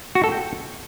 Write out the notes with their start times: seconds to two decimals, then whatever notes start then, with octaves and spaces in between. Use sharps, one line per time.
0.15 F#4
0.24 A4
0.32 G5